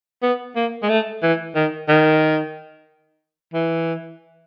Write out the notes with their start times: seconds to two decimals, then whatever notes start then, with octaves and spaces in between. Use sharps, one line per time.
0.23 B3
0.56 A#3
0.83 G#3
0.89 A3
1.23 E3
1.55 D#3
1.89 D#3
3.54 E3